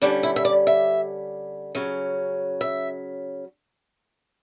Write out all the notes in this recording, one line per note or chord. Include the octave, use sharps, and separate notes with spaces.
D3 G3 C#4 D4
E4
E5
D5
E5
C#3 F#3 C#4
E5